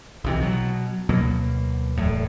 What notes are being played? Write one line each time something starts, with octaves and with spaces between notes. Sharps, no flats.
B1 C3 E3
B2 F#3
D2 B2 F#3 A#3
D#1 E2 A2